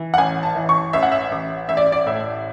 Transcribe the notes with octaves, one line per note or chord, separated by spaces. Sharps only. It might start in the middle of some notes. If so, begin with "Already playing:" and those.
Already playing: E3
F#5
A1 G#5
A5
E3
C#6
A1 E5
F#5
E5
A1
A1 E5
D5
D5
A2 E5